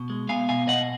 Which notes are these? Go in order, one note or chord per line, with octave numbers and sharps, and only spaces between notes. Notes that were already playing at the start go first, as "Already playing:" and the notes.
Already playing: B2
G#3
B3 F5 G#5
B2 F5 G#5
B2 D#5 F#5